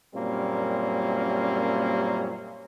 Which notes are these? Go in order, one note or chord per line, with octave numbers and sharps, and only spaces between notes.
F#2 A#2 G3 A#3 C4 C#4